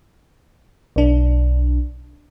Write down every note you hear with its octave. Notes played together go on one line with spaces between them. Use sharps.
B1 D4